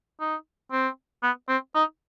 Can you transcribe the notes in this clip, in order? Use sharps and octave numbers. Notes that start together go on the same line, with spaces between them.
D#4
C4
B3
C4
D#4